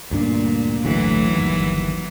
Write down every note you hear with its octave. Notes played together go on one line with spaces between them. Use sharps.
D2 G2 A#2 D4
G1 D2 A2 E3 F#3
G1 D#2